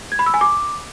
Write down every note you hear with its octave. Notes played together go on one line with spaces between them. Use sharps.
G#6
B5
E6
G#5
D6